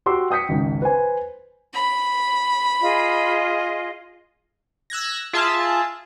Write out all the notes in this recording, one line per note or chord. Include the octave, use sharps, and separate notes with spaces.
F#4 G4 C6 D6 E6
G5 D#6 G6 B6 C#7
G#1 C#2
B4 C5 G#5
B5
F4 G#4 D#5
E6 F#6 G#6 A#6
F4 G#4 E5 A5